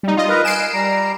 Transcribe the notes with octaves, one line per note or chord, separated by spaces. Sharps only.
G3 D#4
F4 D#5
A#4 B4 A#5
G#5 C7 D7 E7
G3 A#5